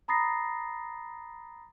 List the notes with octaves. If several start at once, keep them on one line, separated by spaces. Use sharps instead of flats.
A#5 B5 D#6 A6 A#6 C7